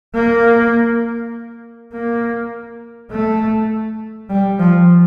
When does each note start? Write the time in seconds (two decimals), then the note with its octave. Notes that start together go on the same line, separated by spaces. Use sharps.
0.15 A#3
1.93 A#3
3.11 A3
4.30 G3
4.59 F3